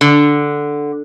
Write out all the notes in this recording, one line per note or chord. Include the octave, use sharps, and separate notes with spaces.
D3